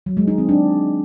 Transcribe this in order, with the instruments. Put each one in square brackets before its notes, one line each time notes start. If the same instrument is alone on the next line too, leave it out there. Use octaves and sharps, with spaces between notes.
[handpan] F#3
G#3
D#4
C4
D4